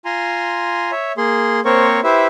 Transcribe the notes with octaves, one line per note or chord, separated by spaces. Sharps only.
F4 G#5 A#5 C6
C#5 E5
A#3 G#4 C6
A#3 C4 A#4 C5 C#5 C#6
E4 G4 B4 C5 E5